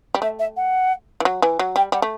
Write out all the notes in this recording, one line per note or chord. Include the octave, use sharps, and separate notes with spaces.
G3
A3 E5
E5
F#5
E3
F#3
E3
F#3
G3 G5
G3 F#5
A3